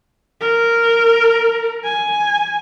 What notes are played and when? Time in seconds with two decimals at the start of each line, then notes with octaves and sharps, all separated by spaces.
0.40 A#4
1.84 G#5